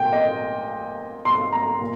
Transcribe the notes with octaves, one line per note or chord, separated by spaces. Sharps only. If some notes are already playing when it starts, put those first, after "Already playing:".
Already playing: A#2 G5
D#5
C6
A#5
A#2